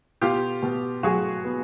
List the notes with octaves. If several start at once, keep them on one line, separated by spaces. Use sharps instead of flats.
B2 F4 G4
B2
F#3 F#4 G#4
B3